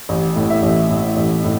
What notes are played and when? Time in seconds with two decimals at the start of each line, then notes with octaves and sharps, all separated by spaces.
0.09 A1
0.36 A2
0.50 E5
0.63 A1
0.90 A2
1.16 A1
1.44 A2